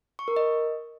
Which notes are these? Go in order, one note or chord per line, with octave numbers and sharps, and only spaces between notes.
C#6
A#4
D#5